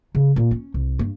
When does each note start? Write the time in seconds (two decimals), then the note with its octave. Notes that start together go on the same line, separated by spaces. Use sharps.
0.15 C#3
0.36 A#2
0.51 C#4
0.74 C2
0.99 G2